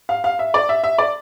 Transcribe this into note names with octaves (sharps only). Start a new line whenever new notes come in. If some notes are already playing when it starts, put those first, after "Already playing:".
F5
F5
E5
D5
E5
E5
D5